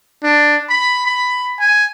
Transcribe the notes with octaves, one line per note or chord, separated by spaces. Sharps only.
D4
B5
B5
G#5